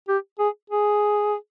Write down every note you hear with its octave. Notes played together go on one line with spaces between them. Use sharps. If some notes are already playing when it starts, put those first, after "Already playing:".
G4
G#4
G#4